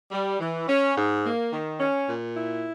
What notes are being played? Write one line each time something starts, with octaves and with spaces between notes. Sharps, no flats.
G3
E3
C#4
G#2
A#3
D#3
C#4
A#2
E4